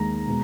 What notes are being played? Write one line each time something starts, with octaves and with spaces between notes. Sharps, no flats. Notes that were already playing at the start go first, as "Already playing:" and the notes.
Already playing: D#2 D#3 G#3 A#5
B2 G#3